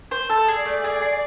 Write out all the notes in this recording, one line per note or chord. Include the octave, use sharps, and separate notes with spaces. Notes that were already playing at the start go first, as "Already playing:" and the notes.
C5
A4
G#4 D5
A3
G#4
G#4